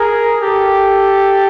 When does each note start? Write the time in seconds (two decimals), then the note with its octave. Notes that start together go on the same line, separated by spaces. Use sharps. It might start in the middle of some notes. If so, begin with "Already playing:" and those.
Already playing: G#4 A#4
0.42 G4 A4